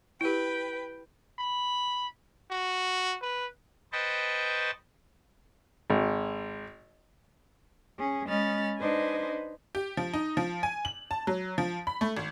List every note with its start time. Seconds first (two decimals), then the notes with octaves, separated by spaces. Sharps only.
0.21 E4 G4 B4 G5
1.39 B5
2.51 F#4
3.22 B4
3.92 B4 C5 D#5 G5 A5 C#6
5.90 G#1
7.99 C#4 G#4
8.28 G#3 C#4 D#5 B5 F6 A6
8.79 D4 D#4 B4 C5 D#5 G#5
9.75 G4
9.97 F3
10.13 D#4
10.37 F3
10.63 G#5
10.85 F#7
11.11 A5
11.27 F#3
11.58 F3
11.87 B5
12.01 A3
12.17 G#1